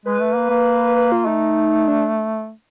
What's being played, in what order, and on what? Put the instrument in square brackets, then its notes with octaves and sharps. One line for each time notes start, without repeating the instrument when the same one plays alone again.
[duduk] G#3 [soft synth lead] B4
[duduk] A3
A#3
A#3
[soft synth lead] B4
F4
[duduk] A3 [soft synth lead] D#4
[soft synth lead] D4